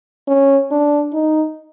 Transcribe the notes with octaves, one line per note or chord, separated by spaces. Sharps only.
C#4
D4
D#4